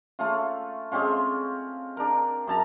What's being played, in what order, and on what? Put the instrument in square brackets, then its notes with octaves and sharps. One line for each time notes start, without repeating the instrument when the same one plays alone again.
[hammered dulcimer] A3 C#4 F4
G#3 C4 C#4 F4
D4 A#4
F#2 A5 A#5